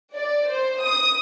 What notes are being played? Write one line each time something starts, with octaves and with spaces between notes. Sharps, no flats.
D5
C5
D#6